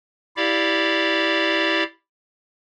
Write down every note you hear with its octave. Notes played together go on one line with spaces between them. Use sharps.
E4 G4 D5 F5